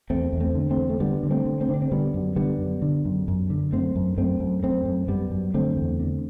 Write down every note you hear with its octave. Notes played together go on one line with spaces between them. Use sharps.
E2 A3 C4
E2
A3 C4
D3
A3 C4
E2
A3
D3 G3 B3
D3
A3 C4
D3
A3 C4
D3 D4
C4
D3 G3 B3
F#2
D3 G3 B3
F#2
D3
F#2
F#2
D3
F#2 A3 C4
F#2
F#2 A3 C4
F#2
F#2 A3 C4
F#2
F#2 G3 B3
F#2
D3 A3 C4
E2
D3